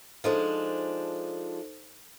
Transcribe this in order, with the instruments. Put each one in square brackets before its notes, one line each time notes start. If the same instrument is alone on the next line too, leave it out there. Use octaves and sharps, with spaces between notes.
[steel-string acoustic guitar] F3 G#3 D4 [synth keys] D#4 A4 C5